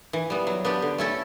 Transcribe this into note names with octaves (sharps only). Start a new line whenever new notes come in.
E3
G3 B3
F#3
B3 D4 G4
D3
A3 C#4 E4 A4